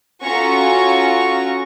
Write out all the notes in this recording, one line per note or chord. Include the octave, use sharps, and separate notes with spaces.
C#4 F4 F#4 A4 A#5 C#6